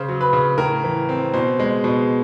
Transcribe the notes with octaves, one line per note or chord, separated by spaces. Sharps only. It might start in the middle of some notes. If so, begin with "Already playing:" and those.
Already playing: C#3 C5
F#3
B4
C#3
A2 A#4
E3
C4
B2 C5
G#3
B2